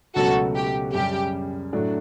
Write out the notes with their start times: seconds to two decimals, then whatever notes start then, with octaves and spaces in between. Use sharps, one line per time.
0.15 C#2 B2 F#3 A3 C#4 F#4 A4
0.55 G4
0.94 F#2 C#3 G3 G4
1.73 A2 F#3 A3 D4 F#4